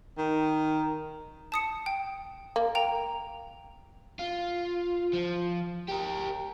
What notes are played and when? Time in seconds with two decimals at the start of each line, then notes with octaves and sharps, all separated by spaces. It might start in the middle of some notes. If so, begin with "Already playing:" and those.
0.17 D#3
1.52 A5 D#6 C#7
1.86 G5
2.56 A#3
2.75 G5 A#5
4.19 F4
5.13 F3
5.89 G4 A#4